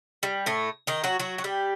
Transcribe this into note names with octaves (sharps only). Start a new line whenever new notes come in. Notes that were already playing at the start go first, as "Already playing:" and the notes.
G3
A2 A3
D#3 D#4
F#3 F#4
F#3 F#4
F#4
G3 G4